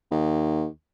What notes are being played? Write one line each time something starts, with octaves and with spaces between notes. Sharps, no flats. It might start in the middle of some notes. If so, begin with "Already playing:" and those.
D#2